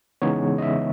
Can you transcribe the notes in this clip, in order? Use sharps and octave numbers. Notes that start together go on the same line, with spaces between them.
C#3 E3 G#3 B3 D#4 C#5
D#5
E5